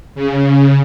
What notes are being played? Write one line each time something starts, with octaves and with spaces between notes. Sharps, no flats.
C#3